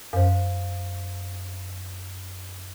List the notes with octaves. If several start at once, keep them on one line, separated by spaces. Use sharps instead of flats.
F#2 C5 F5